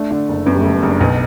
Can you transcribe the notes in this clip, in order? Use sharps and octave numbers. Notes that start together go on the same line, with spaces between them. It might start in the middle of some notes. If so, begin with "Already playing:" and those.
Already playing: A3 D4
D3 D4
F#1
F#2 B3
G3
F#1 A3
B3
F#1 D4
B1 B3